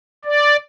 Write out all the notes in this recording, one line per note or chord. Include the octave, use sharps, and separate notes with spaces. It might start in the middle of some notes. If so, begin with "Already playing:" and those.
D5